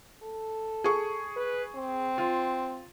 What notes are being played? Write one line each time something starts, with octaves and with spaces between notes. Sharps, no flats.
A4
G#4 C#6
B4
C4
F4